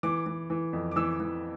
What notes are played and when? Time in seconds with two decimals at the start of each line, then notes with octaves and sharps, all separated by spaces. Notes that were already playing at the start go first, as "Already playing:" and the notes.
0.03 E3 D6
0.26 E3
0.50 E3
0.73 F2
0.91 D6
0.96 E3 E6
1.20 E3